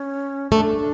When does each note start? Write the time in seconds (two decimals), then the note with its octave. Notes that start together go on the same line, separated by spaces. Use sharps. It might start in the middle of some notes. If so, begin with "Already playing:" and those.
Already playing: C#4
0.51 A3 D4